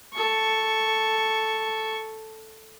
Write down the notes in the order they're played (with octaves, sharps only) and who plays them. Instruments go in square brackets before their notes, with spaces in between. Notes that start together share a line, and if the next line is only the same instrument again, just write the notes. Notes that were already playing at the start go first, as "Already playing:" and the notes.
[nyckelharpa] A4 C#6